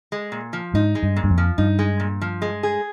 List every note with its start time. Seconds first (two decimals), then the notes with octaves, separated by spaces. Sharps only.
0.12 G#3
0.32 A#2
0.53 F3
0.74 G#2 D#4
0.95 G#3
1.03 G2
1.16 A#2
1.24 G2
1.30 F2
1.38 F3
1.58 G2 D#4
1.79 G#3
2.00 A#2
2.21 F3
2.42 G#3
2.63 G#4